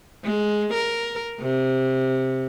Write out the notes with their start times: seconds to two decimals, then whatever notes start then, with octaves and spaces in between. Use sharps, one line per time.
0.24 G#3
0.74 A#4
1.41 C3